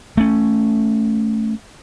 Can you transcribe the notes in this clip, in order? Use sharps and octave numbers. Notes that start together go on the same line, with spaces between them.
A3 C#4